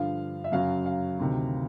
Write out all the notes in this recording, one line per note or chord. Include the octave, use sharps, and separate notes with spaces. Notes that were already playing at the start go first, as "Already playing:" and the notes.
Already playing: G2 D3 F3 F5
E5
F#2 C#3 F#3 F5
F5
D2 C3 D#3